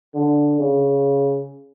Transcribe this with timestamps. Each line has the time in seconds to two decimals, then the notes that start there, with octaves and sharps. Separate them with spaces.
0.14 D3
0.59 C#3